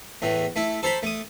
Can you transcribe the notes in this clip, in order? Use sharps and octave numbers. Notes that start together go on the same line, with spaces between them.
E2 A2 E3
A3 E4
A4 C5 A#5 B5
A3 D#6